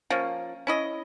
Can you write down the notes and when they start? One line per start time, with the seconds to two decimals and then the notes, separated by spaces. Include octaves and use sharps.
0.10 F3 A#3 C#4
0.67 C#4 E4 D#5